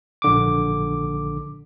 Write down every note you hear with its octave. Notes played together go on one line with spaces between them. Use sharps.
A#1 D3 D6